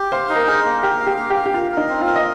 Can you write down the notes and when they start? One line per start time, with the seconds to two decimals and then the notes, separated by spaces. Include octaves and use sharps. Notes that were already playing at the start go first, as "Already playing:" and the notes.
Already playing: G4
0.12 C5 F5
0.29 D#4
0.36 A#4
0.47 G#4 A#4
0.65 A#3
0.83 G4 A#4
1.00 F5
1.07 G4
1.18 A#3
1.30 G4
1.36 F5
1.46 G4
1.54 F4 A#4
1.71 A#4
1.77 D#4
1.89 C4
2.01 F4
2.07 A#4
2.16 D#5